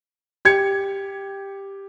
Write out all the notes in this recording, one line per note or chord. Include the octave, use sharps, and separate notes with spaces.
G4 G#6 C#7